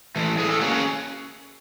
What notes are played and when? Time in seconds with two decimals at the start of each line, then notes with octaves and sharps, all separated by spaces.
0.16 E3 A3
0.38 A2 G#4
0.51 A4
0.61 F#3 A#3 C#4 G#4
0.73 G#4